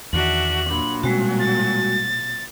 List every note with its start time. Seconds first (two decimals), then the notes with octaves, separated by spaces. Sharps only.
0.13 E2 D#3 D4 F#4 E5 F#7
0.69 A#2 F#3 D4 B5 C6
1.03 B2 G3 G#3 C4 C#4 F#4
1.40 A6